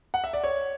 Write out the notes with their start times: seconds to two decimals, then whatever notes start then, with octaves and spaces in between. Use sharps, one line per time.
0.14 F#5
0.24 E5
0.33 D5
0.44 C#5